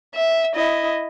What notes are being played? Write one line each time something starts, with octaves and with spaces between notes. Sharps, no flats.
E5
E4 D#5